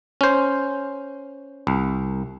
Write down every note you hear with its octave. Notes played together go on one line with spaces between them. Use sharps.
C#4 C5
C2